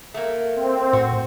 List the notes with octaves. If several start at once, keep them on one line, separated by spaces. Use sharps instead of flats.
A3 A#3
C4
A2 F#4